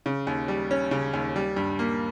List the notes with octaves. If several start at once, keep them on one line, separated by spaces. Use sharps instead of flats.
C#3
D#2
G3
C#4
C#3
D#2
G3
G2
A#3